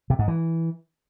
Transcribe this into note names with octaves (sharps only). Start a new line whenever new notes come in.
C3
G#2
E3